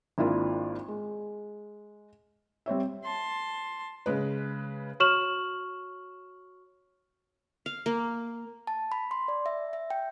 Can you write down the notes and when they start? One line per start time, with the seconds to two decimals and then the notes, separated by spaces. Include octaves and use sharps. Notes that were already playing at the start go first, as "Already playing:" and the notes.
0.18 G#1 A#3 D4 E4 F4
0.88 G#3
2.66 G3 C4 C#5 E5
3.04 A5 C6
4.06 C#3 G#3 B4
5.00 F#4 C#5 C#6 F6 E7 F#7
7.66 F5
7.86 A#3
8.67 A5
8.92 B5
9.11 C6
9.28 D5
9.46 E5
9.73 E5
9.90 G5